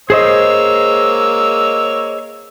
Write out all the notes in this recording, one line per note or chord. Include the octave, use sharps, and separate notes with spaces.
A#3 G#4 C5 C#5 D#5 E6